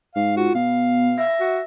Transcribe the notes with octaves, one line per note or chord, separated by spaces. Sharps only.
G#2 F5
F4 F#4
B2 B3 F5
E5 A#6
F#4